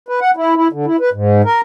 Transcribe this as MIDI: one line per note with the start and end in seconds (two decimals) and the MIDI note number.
0.08 0.20 71
0.21 0.31 78
0.36 0.55 64
0.56 0.68 64
0.73 0.86 50
0.86 0.97 64
1.00 1.10 71
1.13 1.42 44
1.44 1.61 70